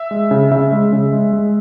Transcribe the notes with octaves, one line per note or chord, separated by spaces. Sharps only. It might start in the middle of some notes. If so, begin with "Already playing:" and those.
Already playing: E5
G#3
C#3
C#3 E5
G#3
C#3
G#3
G#3